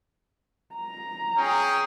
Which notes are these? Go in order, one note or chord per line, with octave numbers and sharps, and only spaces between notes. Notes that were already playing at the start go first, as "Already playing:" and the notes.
A#5
C#4 G#4 G5